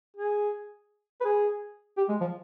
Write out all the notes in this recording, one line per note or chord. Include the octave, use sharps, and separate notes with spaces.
G#4
B4
G#4
G4
G#3
F3